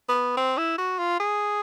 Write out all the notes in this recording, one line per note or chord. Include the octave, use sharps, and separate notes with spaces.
B3
C4
E4
F#4
F4
G#4